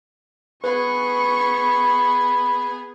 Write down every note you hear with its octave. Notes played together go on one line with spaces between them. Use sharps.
B3 G#4 B4 B5 C#6